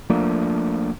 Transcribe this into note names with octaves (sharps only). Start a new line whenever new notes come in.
F3 A3 A#3 D4